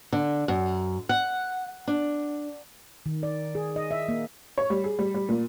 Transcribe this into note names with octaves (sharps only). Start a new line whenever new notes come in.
D3
F#2
F#5
D4
D#3
D5
G#4
D#5
E5
A#3
C#5
G3
G#4
G3
G3
A#2